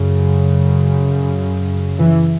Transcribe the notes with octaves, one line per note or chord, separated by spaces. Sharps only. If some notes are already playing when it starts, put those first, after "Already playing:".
Already playing: F#2 C#3
E3